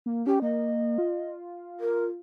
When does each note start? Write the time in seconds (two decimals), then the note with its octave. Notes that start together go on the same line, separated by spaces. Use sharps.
0.06 A#3
0.27 C#4 G4
0.42 A#3 D#5
0.98 F4
1.80 A#4